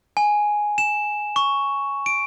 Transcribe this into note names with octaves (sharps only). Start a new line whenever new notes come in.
G#5
E7
C#6
D7